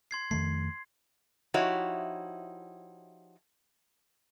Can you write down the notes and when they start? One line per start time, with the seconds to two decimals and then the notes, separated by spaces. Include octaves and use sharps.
0.11 C6 G#6 C7
0.31 F2 D#3 A3 C7
1.54 F3 D#4 E4 F#4 G4 C#5